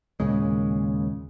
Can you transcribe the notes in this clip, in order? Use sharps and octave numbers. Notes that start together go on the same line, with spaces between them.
D#2 A#2 C#3 G#3